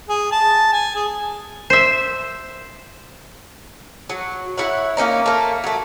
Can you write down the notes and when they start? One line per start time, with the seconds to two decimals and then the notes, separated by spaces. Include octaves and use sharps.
0.09 G#4
0.32 A5
0.73 G#5
0.96 G#4
1.70 C5 E5
4.10 F#3
4.58 E4 C#5 F#5
4.97 A#3 C4 C#4 D#4
5.26 A3 A#3
5.64 F#3 A3